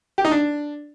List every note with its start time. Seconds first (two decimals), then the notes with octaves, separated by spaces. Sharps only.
0.18 G4
0.25 D#4
0.31 D4